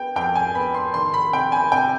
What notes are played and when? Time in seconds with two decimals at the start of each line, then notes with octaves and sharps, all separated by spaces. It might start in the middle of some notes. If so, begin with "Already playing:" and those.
Already playing: B3 G5
0.16 F2 G5
0.35 G#5
0.55 B3 B5
0.74 C6
0.94 D#3 C6
1.14 B5
1.32 C3 G5
1.52 G#5
1.72 C3 G5